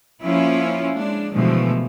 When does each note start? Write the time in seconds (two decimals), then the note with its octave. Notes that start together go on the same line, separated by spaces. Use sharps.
0.22 F3 A#3 C#4 E4 F4
0.95 G#3 D4
1.34 B2 D3 E3 F3 G#3 A3